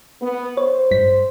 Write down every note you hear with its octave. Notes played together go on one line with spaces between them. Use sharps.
B3
C5 C#5
A1 G2 B6